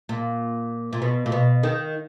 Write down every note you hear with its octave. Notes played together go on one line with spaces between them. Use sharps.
A#2
A#2
B2
A#2
B2
D#3